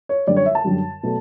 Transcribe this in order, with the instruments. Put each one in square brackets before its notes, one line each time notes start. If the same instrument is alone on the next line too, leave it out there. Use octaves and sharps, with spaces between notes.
[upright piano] C#5
F#2 D3 G3 D5
C#5
E5
A5
F#2 D3 G3
B2 F#3 A3